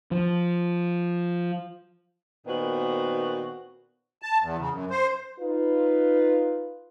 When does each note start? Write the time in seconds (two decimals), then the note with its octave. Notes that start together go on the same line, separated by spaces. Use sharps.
0.11 F3
2.47 A#2 D#3 B3 C4 F#4
4.22 A5
4.42 E2
4.58 C#3
4.72 F#2
4.90 C5
5.39 D#4 F4 B4